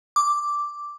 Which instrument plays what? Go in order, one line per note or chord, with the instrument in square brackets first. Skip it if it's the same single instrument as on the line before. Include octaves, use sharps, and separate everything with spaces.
[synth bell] D6